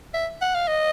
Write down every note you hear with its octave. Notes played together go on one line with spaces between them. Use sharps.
E5
F#5
F5
D#5